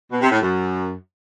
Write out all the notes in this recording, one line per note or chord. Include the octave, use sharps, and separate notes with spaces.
B2
C3
A2
F#2